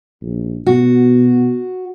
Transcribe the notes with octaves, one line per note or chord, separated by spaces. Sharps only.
A#1
B2 F#4